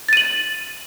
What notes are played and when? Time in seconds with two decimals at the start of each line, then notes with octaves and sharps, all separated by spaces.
0.09 A6
0.13 D#7
0.17 F#7